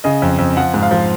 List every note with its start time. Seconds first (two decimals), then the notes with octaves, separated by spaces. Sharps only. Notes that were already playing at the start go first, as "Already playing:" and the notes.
0.04 C#3 D#5
0.22 F2
0.38 F2
0.57 F3 F#5
0.74 G#2
0.83 F5
0.91 F3